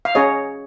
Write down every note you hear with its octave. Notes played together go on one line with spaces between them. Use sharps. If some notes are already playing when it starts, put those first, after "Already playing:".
F5
C#4 G#4 C#5 D#5